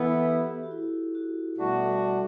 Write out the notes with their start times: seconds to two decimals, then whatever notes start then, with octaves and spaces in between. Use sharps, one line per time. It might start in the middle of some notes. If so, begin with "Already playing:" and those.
Already playing: E3 B3 E4 A4
0.28 G4
0.63 F#4
0.71 E4
1.15 F#4
1.58 B2 G3 A3 D4 F#4
1.88 G3